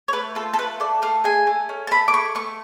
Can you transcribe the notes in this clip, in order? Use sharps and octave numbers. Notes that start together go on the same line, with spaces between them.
C#5
A3 B4
F4 A4
A4
A3 B4
A4 D5
A3 F5
G#4 G#5
A3
C#4
A5
A3 B5
D6
G#4 C#6
A3 C#6